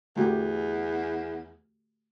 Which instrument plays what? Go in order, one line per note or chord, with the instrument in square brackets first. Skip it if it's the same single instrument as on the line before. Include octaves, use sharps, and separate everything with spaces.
[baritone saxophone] E2 [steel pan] A3 F#4 G4